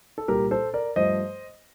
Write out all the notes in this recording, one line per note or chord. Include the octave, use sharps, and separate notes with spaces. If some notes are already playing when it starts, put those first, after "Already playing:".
A4
C2 A#2 G3 G4 A#4
A4 C5
A#4 D5
G2 F3 A3 C5 D#5